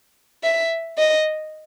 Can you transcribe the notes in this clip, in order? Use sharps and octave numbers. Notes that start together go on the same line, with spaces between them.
E5
D#5